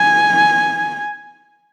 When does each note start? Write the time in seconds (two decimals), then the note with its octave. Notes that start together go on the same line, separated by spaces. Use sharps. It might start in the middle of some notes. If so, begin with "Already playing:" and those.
Already playing: G#5